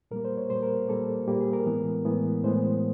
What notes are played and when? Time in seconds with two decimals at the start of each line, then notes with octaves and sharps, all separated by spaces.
0.11 A#2 G3 A#3 A#4
0.25 C5
0.37 C#5
0.50 A#2 G3 A#3 C5
0.63 A#4
0.88 A#2 G3 A#3 A4
1.27 A#2 G3 A#3 G4
1.41 G#4
1.53 A#4
1.66 A2 E3 G#3 B3
2.05 A2 E3 G#3 B3
2.44 A2 E3 G#3 B3 C5